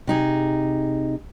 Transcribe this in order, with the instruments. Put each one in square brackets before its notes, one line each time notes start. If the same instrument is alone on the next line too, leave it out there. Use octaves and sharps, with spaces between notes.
[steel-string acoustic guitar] C3 D#4 G#4